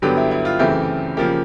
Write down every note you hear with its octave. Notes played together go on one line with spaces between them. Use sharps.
G2 D3 F#3 B3 G4
E4
E4
F4
F#2 C#3 E3 A3 C4 G4
C#3 F3 A#3 G4